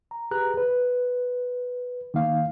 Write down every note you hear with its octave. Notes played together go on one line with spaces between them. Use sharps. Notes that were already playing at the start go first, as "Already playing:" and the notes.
A#5
G4 G#4 B4 A#5 F#6
B4
D#3 A#3 D#4 F5